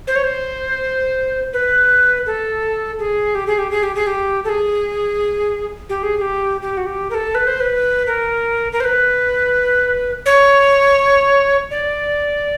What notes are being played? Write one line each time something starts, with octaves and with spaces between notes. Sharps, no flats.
C5
C#5
C5
B4
A4
G#4
G4
G#4
G4
G#4
G4
G#4
G4
A4
G#4
G4
G#4
G#4
G4
G4
F#4
G4
A#4
A4
B4
C5
B4
A#4
A#4
C5
B4
C#5
D5